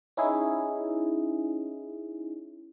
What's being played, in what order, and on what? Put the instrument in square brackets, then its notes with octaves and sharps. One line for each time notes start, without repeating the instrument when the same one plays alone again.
[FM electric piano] C#4 D#4 E4 G#4